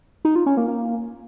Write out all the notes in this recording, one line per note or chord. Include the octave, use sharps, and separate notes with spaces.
D#4
F4
C#4
A#3
A#3